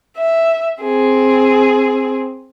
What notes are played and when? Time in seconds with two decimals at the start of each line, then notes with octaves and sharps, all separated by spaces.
0.17 E5
0.83 C4 G#4